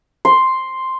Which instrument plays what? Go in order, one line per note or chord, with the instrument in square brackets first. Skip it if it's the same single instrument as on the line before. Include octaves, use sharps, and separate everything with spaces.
[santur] C6